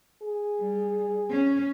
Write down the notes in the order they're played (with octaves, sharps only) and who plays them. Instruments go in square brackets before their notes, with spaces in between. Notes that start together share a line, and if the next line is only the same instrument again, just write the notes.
[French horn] G#4
[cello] G3
C#4